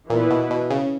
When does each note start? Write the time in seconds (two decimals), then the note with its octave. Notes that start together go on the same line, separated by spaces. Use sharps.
0.09 A#2 E3 B3 E4 B4
0.30 B2
0.51 B2
0.70 C#3